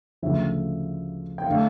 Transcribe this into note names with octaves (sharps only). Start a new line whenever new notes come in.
D2 C#3 F3 E5
G5
D3 A3 F5